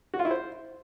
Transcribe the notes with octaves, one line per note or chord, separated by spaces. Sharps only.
F#4
F4
E4
C5